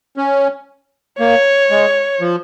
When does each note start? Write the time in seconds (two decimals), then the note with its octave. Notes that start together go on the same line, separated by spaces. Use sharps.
0.17 C#4
1.19 A#3 C#5
1.70 G#3
2.21 F3